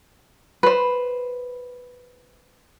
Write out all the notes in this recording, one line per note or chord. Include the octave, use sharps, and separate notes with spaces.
B4 C5